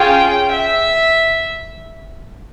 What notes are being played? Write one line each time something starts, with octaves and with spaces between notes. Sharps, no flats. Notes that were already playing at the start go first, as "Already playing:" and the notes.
Already playing: C#4 F4 G#4 G5
E5